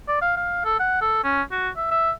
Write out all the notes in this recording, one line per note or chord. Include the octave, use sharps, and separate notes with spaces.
D5
F5
F5
A4
F#5
A4
C#4
F#4
E5
E5